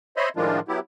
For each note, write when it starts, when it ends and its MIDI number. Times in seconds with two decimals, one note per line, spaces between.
0.17 0.29 72
0.17 0.29 73
0.17 0.29 75
0.17 0.29 76
0.17 0.29 83
0.17 0.29 84
0.36 0.60 45
0.36 0.60 51
0.36 0.60 53
0.36 0.60 56
0.36 0.60 62
0.36 0.60 65
0.68 0.79 54
0.68 0.79 59
0.68 0.79 64
0.68 0.79 67